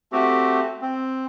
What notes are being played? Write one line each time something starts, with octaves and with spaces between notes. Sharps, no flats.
A3 C4 F#4 G4
C4